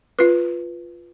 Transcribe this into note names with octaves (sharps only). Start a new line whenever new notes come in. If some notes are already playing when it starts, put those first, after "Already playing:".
F4 B4